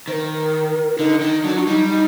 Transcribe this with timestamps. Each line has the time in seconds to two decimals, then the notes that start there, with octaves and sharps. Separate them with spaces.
0.08 D#3 C5
0.13 A#4
0.98 D3 D#4
1.21 D#3 D#4
1.44 F#3 D4
1.58 F#4
1.67 G3 D#4
1.90 D#4